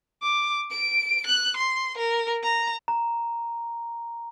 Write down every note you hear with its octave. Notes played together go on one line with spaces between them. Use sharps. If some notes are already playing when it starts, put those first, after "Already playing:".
D6
D7
F#6
C6
A#4
A#5
A#5